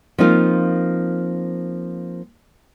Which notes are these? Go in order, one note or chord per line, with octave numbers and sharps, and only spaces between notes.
F3 A#3 C4 D#4 F4 A#4